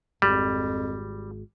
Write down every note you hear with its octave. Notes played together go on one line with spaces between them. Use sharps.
G#1 F2 G3